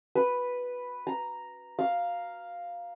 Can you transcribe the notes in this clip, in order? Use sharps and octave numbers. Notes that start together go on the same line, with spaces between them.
B4
A#5
F5